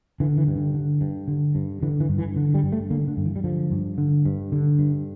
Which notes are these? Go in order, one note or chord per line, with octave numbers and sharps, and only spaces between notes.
D3 E3
E3
G2
D3
D3
G2
D3
G2
D3 E3
E3
G2
E3
D3
G3
G2
A3
D3 A#3
D3
G2
E3
G3
D3 F3
G2
D3
G2
D3
G2